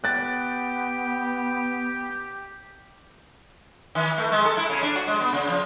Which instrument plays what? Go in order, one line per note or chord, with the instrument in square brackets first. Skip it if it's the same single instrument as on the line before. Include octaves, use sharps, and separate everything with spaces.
[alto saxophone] B3 [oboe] G4 [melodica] G5 [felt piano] F#6 A6
[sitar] D#3
A3
G#3
A4
E4
C#3
D4
F#4
G#3
B3
C#3
F3